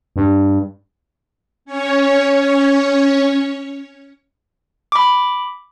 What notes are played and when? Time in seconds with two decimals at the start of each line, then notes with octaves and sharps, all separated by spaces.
0.16 G2
1.65 C#4 C#5
4.92 B5 D6